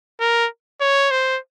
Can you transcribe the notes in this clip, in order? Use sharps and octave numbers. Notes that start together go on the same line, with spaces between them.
A#4
C#5
C5